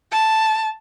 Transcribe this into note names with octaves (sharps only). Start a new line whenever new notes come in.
A5